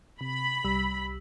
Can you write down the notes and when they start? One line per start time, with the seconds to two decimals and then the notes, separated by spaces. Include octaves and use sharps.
0.21 C3 B5
0.64 C2 G3 E6